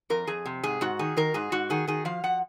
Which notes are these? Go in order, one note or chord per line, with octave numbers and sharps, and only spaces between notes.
F2 A#4
F2 G#4
C3
G#2 G#4
G#2 F#4
D#3 G#4
D#3 A#4
G#2 G#4
G#2 F#4
D#3 G#4
D#3 G#4
F3 F5
F3 F#5